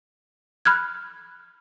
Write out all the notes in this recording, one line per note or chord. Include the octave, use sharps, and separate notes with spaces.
B5 F6 F#6 G#6